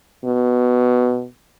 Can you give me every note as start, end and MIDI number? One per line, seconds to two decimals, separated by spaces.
0.25 1.26 47